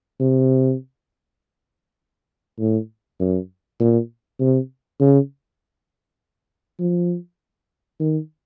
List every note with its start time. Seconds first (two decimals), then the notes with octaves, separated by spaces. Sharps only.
0.20 C3
2.59 A2
3.20 F#2
3.80 A#2
4.40 C3
5.00 C#3
6.79 F3
8.00 D#3